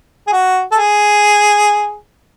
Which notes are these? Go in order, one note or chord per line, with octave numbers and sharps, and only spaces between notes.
G#4
F#4
A4
G#4